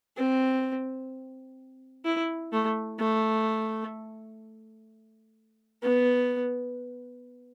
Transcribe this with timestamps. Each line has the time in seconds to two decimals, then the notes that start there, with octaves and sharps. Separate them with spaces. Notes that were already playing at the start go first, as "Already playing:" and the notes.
0.17 C4
2.05 E4
2.52 A3
3.00 A3
5.83 B3